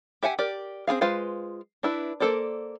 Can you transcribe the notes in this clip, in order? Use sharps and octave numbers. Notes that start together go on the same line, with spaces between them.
G4 E5 F#5 G#5
G4 A#4 D5
C4 F4 G#4 F5
G#3 F4 B4 C5 F5
D4 E4 B4
A#3 G#4 A4 C5 D5